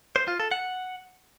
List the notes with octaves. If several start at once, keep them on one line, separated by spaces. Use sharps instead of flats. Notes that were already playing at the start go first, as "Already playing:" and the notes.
C5
F4
A4
F#5